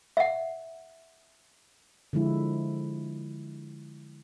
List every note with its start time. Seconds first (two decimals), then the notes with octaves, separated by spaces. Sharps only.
0.17 E5 F#5
2.13 D3 F3 G#3 E4